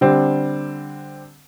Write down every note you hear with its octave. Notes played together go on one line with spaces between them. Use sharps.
D3 G3 C4 D4